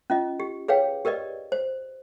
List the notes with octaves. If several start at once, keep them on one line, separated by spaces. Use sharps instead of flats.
C#4 F4 D#5
G4
G#4 B4 C#5 F5 G5
G4 A#4 B4 D5 D#5
C5